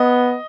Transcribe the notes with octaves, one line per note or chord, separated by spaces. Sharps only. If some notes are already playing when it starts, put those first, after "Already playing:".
Already playing: B3 D#5